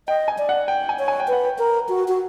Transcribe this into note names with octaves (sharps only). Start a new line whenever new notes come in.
D#5 G5
G#5
D5
F#5
G5
G#5
C#5
G#5
G5
B4 F#5
G5
A#4
F#4
F#4